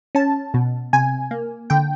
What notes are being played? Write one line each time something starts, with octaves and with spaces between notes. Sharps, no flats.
C#4 A5
B2
C3 G#5
A#3
D3 G5